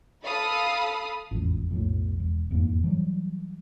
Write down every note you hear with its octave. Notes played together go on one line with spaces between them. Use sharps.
A4 F5 B5 D#6
E1 A1 F2
B1 F2 A2
E1
E1 F2 G#2 A#3
E3 F#3 G3